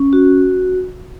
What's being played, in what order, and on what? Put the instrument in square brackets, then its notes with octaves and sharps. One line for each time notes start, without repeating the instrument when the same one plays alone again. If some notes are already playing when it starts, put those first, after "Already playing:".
Already playing: [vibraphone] C#4
F#4